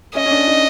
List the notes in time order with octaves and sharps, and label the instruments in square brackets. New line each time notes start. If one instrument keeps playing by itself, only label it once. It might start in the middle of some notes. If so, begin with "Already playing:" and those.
[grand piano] C#4 [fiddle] D#5
[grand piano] C#4
D4
D#4